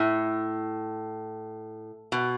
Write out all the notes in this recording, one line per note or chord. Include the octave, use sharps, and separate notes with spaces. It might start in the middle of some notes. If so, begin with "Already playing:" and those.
Already playing: A2
B2